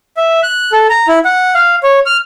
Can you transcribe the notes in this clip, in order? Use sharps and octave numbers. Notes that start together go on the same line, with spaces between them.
E5
F#6
A4
A#5
E4
F#5
F5
C#5
F6